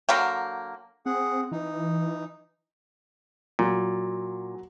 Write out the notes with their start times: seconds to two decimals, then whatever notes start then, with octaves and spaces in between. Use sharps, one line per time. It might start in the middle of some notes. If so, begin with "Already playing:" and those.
0.09 D3 F#3 A#3 G5
1.06 C4 G#4 F#5
1.52 E3 D#4
3.59 A#2 F#3